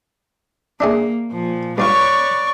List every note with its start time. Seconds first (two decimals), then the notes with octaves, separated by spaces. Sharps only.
0.80 A#3 D4 E4 G#4
1.31 A#2 F3
1.78 G2 F4 B4 C#5 D5 F5 C#6